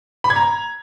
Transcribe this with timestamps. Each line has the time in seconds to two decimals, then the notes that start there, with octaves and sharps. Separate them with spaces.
0.24 B5
0.30 G#6
0.36 A#5